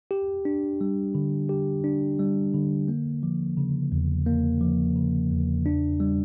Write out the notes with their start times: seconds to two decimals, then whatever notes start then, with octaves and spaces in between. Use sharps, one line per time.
0.11 G4
0.45 D4
0.81 G3
1.15 D3
1.49 G4
1.84 D4
2.19 G3
2.54 D3
2.88 A#3
3.23 F3
3.57 C#3
3.92 E2
4.26 A#3
4.61 F3
4.96 C#3
5.31 E2
5.66 D4
6.00 G3